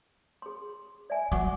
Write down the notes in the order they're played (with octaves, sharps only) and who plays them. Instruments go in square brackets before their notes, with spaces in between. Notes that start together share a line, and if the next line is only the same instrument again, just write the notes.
[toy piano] G#4 C6
D5 E5 G#5
[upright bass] F#3 [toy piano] F#5 C#6 D6